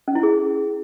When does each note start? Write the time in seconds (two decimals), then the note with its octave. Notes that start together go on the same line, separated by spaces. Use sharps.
0.08 C#4
0.15 E4
0.23 G#4